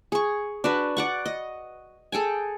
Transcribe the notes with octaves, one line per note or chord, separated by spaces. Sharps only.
G#4 C#6
D4 F#4 B4
D5 F#5 C#6
D#5
G#4 A4 G5 G#5